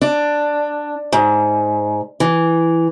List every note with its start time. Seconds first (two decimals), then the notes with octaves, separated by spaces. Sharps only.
0.01 D4
1.12 G#2
2.20 E3